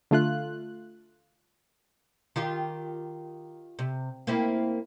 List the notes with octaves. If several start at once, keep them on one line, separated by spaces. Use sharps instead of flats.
D3 A3 F4 F#6
D#3 F4 G4
C3
A#3 C4 E4